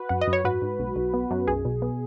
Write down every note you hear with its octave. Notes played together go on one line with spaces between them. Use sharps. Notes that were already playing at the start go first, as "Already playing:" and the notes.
Already playing: F#4 B4
F#2 F#5
D#5
F#2
C#5
G#2 F#4 B4
G#2
B1
B1
B3
F#2
B1 G#4
B2
B3